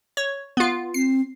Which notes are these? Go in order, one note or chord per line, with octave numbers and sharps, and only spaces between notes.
C#5
B3 F4
C4 C7